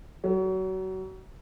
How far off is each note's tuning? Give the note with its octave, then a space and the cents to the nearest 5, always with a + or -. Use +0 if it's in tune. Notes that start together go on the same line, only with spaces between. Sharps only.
F#3 +30